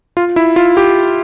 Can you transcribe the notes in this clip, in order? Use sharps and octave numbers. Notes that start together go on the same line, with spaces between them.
F4
E4
F4
G4